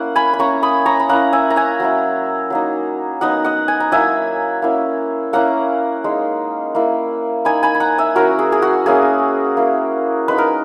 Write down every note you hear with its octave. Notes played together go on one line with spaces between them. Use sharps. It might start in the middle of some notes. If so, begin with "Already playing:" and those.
Already playing: A#3 C#4 E4 F#5
G#5 B5
B5
A#3 C#4 E4 A#5 C#6
B5 D#6
A#5 C#6
B5
A#3 C#4 E4 F#5 A#5
E5 G#5
A#5
E5 G#5
F#3 C#4 E4
F#3 A#3 D#4
F#3 B3 D#4 D#5 F#5
D#5 F#5
G#5
A#5
F#3 A#3 E4 E5 G#5
A#3 C#4 E4
A#3 C#4 E4 F#5 A#5
G#3 D#4
A#3 E4
A#3 D#4 G#5 B5
G#5 B5
B5
F#5 A#5
E5 G#5
F#3 C#4 E4 F#4 A#4
G#4
G#4
F#4
A#3 C#4 E4 G#4
A#3 E4
G#3 D#4 B4
A#4